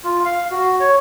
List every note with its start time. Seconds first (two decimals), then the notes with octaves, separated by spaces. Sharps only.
0.04 F4
0.25 F5
0.51 F#4
0.80 C#5